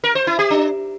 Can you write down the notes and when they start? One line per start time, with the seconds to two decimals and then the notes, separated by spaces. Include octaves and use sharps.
0.04 A#4
0.15 C5
0.27 E4
0.39 G4
0.50 D4